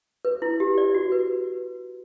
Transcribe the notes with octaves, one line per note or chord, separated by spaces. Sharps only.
B4
E4
G4
D5
F#4
B4